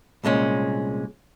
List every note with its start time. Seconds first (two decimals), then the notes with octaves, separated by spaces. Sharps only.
0.24 C2 A#2 G#3 C#4